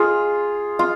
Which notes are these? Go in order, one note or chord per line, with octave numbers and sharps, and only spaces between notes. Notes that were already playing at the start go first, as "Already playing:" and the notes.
Already playing: F4 G#4
F4